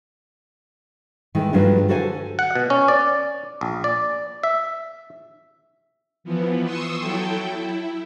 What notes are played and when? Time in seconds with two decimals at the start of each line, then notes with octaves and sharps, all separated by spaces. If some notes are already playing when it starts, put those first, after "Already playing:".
1.35 D#3 E3 G#3 A3
1.53 G2 F3 F#3 G#3 A3 D4
1.89 D3 F#4 A4 C5 D#5 G#5
2.39 F#5
2.56 B2
2.70 C#4
2.88 D5
3.61 A#1
3.84 D5
4.43 E5
6.24 E3 F3 B3
6.63 C6 C#6 D#6 E6
7.00 F#3 E4 A4 G5
7.40 E4